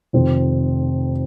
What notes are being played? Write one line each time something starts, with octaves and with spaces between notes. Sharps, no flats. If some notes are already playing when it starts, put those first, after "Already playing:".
F1 F2 D#3 C4